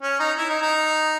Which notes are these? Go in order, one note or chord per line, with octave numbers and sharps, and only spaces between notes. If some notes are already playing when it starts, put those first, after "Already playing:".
C#4
D#4
E4
D#4
D#4